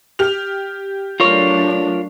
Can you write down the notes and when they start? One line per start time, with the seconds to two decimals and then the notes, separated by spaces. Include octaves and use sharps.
0.19 G4 F6 F7
1.20 F#3 A3 D4 F4 A#4 C#5